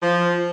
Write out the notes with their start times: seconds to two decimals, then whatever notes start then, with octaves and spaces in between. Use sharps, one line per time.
0.03 F3